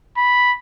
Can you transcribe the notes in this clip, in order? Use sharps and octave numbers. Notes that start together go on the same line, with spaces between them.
B5